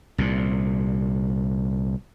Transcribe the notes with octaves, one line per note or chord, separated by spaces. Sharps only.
C2 A#2